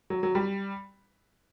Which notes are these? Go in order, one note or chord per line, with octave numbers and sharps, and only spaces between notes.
F#3
F#3
G3